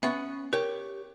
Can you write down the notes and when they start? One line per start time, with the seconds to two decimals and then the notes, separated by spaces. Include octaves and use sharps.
0.03 B3 C#4 E5 F#5
0.53 G4 A#4 C#5